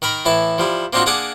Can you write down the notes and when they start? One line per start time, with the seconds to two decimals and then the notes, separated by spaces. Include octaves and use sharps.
0.02 D#3 A#4 A#5 B5
0.25 A2 E3 E4 A5
0.58 F3 G3 E4
0.93 A#3 C4 D4 D#4 F4 F#4
1.06 A#3 D4 G#4 F#5 D6 D#6